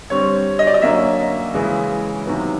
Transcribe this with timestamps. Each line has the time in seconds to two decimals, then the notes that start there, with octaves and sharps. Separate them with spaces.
0.10 D3 G3 C4 C#5
0.59 D#5
0.67 D5
0.74 D#5
0.82 D3 F#3 A#3 C#4 E5
1.54 C#3 E3 G#3
2.26 C3 D#3 F#3 B3